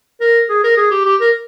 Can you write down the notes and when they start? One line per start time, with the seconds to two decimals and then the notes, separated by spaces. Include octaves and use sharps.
0.21 A#4
0.50 G#4
0.64 A#4
0.77 G#4
0.91 G4
1.05 G4
1.21 A#4